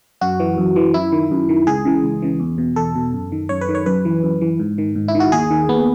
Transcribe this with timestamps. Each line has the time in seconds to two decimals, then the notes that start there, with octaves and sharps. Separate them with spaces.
0.21 F#2 F#4
0.40 E3
0.58 F#2
0.76 E3
0.94 F#2 E4
1.12 D#3
1.31 F#2
1.49 D#3
1.67 C#2 G#4
1.85 C#3 E3
2.04 C#2
2.22 C#3 E3
2.40 E2
2.58 B2
2.76 E2 A4
2.96 B2
3.14 F#2
3.32 D#3
3.49 F#2 C#5
3.61 B4
3.69 D#3
3.75 C#5
3.86 F#2 B4
4.05 E3
4.23 F#2
4.41 E3
4.59 G#2
4.78 D#3
4.95 G#2
5.08 E4
5.15 D#3
5.20 F#4
5.32 D#2 G#4
5.51 D#3
5.69 D#2 B3